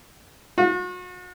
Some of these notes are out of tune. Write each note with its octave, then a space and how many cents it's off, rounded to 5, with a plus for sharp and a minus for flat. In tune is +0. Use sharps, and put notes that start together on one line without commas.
F#4 -40